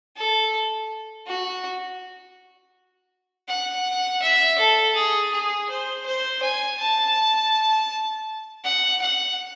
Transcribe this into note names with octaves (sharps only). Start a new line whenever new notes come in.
A4
F#4
F#5
E5
A4
G#4
G#4
C5
C5
G#5
A5
F#5
F#5